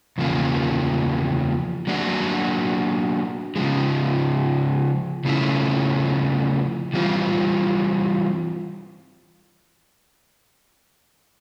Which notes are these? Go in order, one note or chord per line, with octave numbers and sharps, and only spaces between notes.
E2 C#3 F3 A#3
F#3 A#3 D4 F#4
C#3 F3 G#3
C#3 F3 A3 C#4 E4
E3 G3 C4 F4